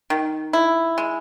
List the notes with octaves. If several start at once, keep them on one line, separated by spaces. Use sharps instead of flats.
D#3
E4
G#3